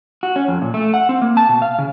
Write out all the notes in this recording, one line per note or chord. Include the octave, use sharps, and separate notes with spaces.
F#4
C#4
F2
A#2
A3
F#5
C4
A#3
A5
B2
F5
C#3